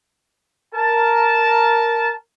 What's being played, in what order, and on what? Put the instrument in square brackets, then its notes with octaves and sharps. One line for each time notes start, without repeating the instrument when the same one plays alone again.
[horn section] A#4 A5